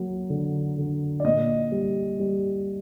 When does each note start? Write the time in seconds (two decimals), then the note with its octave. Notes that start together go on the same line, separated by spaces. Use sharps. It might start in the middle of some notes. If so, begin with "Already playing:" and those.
Already playing: F#3 A#3
0.30 D3
0.78 D3
1.20 D5
1.24 A#2 D#5
1.72 G3
2.20 G3